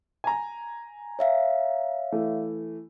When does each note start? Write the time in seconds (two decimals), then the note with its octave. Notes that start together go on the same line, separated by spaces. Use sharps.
0.24 G#5 A#5
1.19 C#5 E5 F5
2.12 E3 A3